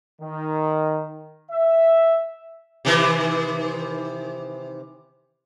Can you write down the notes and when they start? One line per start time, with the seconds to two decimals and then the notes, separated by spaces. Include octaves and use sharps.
0.21 D#3
1.51 E5
2.85 C3 D#3 E3